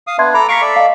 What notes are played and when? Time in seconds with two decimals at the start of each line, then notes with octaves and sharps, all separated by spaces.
0.07 F5 D#6
0.18 B3 D4 E5 C6 G#6
0.34 A4 A#5 B5 D6
0.49 F5 A#5 C#6 B6 C7 D7
0.61 A4 D5 E5
0.76 D#5 F5